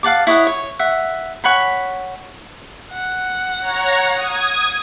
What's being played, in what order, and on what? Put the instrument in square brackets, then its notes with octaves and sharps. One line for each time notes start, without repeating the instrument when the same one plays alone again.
[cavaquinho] F5 F#5 A5 D6
E4 C#5 D#5 F#5
C#5
E5 F#5
C#5 F#5 G#5 B5
[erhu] F#5
[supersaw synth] C#5 A#5
D#6 G#6